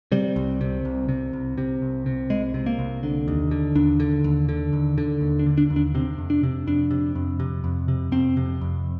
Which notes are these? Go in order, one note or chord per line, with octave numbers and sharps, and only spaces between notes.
C3 G3
C2
C3
C2
C3
C2
C3
C2
C3
C2 G#3
C3
A#3
C2
D3
D#2
D3
D#2 D4
D3
D#2
D3
D#2
D3
D#2
D4
D3
D4
D#2
D4
C3 C4
F2
D4
C3
F2 D4
C3
F2
C3
F2
C3
F2 C4
C3
F2